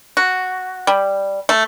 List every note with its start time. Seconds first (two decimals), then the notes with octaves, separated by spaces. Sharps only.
0.17 F#4
0.87 G3
1.49 A3